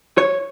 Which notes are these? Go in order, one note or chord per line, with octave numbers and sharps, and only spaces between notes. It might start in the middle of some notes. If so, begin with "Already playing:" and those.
C#5